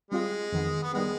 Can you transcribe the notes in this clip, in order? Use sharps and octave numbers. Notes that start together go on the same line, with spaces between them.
G3 G#3 C4 F4
F2 D#3 B3
B3
D#3 G3 G#3 B3